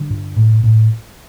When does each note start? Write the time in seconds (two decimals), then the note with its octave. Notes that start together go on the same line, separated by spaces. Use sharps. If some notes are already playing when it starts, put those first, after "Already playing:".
Already playing: D3 G3
0.10 G2
0.36 A2
0.63 A2